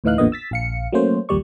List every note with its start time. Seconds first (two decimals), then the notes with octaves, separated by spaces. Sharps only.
0.04 D2 A2 E3 D#4 F5 F#6
0.18 A1 E2 A#2 D3 B3 D#5
0.32 E6 A6 B6
0.51 A#1 F5 C#7
0.93 F#3 A3 A#3 C#4 C5
1.29 A#1 D#2 A#2 G3 D5 C#6